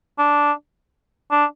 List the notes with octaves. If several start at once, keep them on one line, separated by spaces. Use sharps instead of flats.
D4
D4